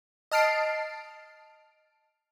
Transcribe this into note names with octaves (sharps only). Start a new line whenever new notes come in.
D#5 A5 F6 C7 D7